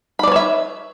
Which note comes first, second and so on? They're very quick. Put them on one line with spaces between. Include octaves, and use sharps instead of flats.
B5 D5 B4 C#5 E5